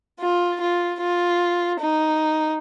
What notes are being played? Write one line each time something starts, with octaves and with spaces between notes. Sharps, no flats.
F4
F4
F4
D#4